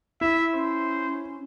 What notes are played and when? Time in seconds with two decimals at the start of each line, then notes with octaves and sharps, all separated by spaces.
0.21 E4 E5
0.54 C#4 C5